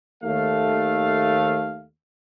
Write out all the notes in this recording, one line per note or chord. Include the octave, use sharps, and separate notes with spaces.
D#2 A3 F5